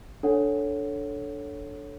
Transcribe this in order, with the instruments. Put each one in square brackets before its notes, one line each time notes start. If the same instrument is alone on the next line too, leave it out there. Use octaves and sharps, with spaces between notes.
[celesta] D4 A4 C#5 F#5